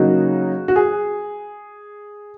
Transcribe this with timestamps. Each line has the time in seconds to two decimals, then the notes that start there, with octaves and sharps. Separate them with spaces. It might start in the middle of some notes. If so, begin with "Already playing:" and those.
Already playing: C#3 F#3 A#3 D#4 F#4
0.68 F#4
0.76 G#4